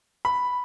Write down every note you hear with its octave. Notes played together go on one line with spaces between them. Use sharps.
B5